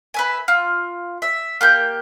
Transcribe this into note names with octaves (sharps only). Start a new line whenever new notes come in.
B4 E5 G#5
F4
E5
A#3 G4 G6